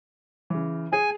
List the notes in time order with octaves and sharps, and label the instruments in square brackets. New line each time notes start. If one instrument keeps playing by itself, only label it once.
[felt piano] C#3 E3
[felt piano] G#4 [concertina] G#5